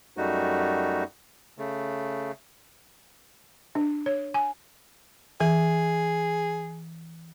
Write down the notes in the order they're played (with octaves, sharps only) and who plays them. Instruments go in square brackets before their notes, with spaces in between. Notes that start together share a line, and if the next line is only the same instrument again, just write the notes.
[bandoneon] F#2 G3 A3 D#4 F#4
C#3 A3
[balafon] D4
C#5
G#5
[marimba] E3 [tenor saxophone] G#4